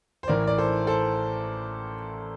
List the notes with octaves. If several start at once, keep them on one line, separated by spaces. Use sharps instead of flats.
C5
A1 A2 E3 A#4 D5
D5
A4 C5
A4 C5